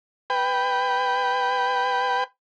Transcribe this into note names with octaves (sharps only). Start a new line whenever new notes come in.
B4 G5